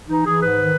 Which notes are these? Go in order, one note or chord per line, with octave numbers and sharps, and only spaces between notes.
E3 D#4
E3 G#4
G#2 B4
D#3